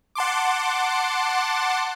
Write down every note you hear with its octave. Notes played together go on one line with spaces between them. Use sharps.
F#5 A5 C6 D6